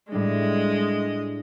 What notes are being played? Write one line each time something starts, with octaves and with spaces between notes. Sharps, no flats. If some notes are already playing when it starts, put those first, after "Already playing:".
A2 G3 G#3 D4 D#5